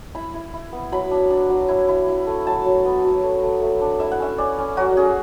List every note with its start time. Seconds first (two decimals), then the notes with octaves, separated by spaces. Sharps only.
0.15 E4 B5
0.34 E4
0.54 E4
0.72 B3
0.92 F#3 B5
1.11 D4
1.31 D4
1.50 F#3
1.68 E4
1.88 E4
2.08 E4
2.27 A3
2.46 F#3 A5
2.65 F#3
2.85 B3
3.04 F#3
3.24 A3
3.43 A3
3.62 A3
3.81 D4
4.00 E4 E5
4.12 F#5
4.20 C#4 E5
4.38 C#4 D5
4.59 C#4
4.77 F#3 F#4
4.97 C#4 G#4